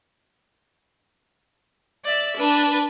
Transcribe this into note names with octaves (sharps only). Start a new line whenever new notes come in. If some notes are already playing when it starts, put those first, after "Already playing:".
D5 E5
D4 B4